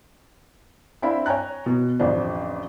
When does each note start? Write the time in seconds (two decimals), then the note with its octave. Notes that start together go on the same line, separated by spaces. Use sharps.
1.02 C4 D4 E4 F5 B5
1.26 C#5 G5 G#5 A#5 F#6
1.66 B2
1.99 A1 F2 D3 D4 C5